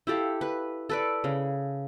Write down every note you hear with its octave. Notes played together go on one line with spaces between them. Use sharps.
E4 G4 A4 F5
B4
A4 B4 D5
C#3